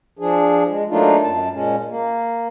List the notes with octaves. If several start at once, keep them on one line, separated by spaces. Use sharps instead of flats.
F3 D4 G#4
G#3
F#3 A3 A#3 D4 D#4 F4
F#2 A5
A#2 G#3 C#4
A#3